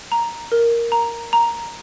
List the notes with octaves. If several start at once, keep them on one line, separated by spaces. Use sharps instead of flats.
A#5
A#4
A#5
A#5